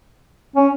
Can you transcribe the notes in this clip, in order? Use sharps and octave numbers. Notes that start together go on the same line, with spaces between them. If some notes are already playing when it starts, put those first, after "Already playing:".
C#4